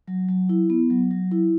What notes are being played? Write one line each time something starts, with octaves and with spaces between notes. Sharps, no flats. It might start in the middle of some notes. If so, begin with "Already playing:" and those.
F#3
F#3
E4
B3
F#3
F#3
E4